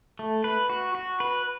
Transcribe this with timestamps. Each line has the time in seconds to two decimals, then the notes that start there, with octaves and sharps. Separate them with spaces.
0.19 A3
0.44 B4
0.70 F#4
0.95 F#4
1.20 B4